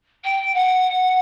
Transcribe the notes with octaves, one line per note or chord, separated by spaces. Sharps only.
G5
F#5